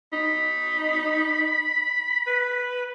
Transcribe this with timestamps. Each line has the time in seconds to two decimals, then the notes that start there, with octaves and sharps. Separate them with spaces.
0.13 D#4 B5
2.27 B4